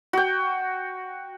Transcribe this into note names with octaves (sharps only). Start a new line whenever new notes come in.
F#4 G5